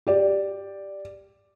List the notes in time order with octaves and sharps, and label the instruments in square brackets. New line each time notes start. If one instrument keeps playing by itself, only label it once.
[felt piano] G4 D5